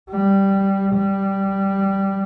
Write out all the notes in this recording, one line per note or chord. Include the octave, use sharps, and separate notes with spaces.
G3
G3